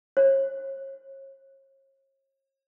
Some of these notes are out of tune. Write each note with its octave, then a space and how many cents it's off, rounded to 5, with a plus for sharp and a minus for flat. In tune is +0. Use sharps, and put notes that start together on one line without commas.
C#5 -40